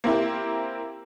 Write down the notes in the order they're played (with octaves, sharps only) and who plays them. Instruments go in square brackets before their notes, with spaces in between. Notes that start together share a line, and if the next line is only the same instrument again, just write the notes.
[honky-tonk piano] A#3 C4 E4 G4